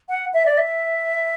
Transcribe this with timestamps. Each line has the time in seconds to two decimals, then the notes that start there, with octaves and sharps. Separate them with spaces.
0.09 F#5
0.33 E5
0.46 D5
0.58 E5